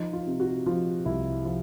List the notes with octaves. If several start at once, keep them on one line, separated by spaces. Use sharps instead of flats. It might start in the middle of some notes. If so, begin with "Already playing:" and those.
Already playing: F3 D#4
F4
C3
F#4
F3 F4
C2 E4
F3 F4